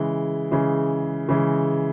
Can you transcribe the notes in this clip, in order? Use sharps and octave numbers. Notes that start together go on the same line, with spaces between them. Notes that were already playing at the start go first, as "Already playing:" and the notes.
Already playing: C#3 E3 G#3
C#3 E3 G#3
C#3 E3 G#3